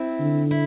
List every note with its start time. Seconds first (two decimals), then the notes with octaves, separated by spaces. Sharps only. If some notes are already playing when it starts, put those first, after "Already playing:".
Already playing: C4 E4
0.20 D3
0.51 E4